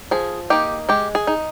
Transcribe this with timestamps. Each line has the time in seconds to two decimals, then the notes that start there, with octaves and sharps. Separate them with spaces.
0.11 F3 G#4
0.50 A#3 D#4 G4
0.89 G#3 G4
1.15 G#4
1.27 D#4